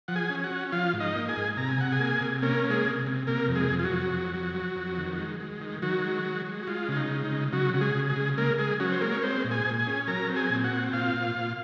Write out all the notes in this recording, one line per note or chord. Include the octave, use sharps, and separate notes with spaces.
F3 F#5
G#4 G#5
C#4
F#4 F#5
C#4
F3 F4 F5
G#2
D#4 D#5
A#3
G#4 G#5
G#2
C3 A#5
G#5
C3 F#5
G#4 G#5
A#3
C3
A#3 C#4 A#4
A#3
G#3 G#4
C3
C3
C3 A#3 A#4
F2
G#3 G#4
F2
F4
F#3 F#4
F2
F2
F#3
F#3
F2
D#3
G#3
G#3
D#3
D#3 F#3 F#4
G#3
G#3
G#3
F#4
G#3 F4
C#3 F4
D#4
G#3
D#4
C#3
C#3 F#3 F#4
C#3 F#4
G#3 G#4
C#3
G#3 G#4
C#3
G#3 A#3 A#4
G#3 G#4
F#3 C#4 F#4
C5
G#3 A#3 A#4
C#5
G#3 C4 C5
A#2
G#4 G#5
A#2
G#4 G#5
C#4
F#3 A#4 A#5
C4
G#4 G#5
A#2
F#4 F#5
C4
A#2 F4 F5
A#2
A#2